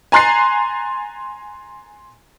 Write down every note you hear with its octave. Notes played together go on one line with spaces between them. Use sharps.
G#5 A#5 C6 F#6 A6 C7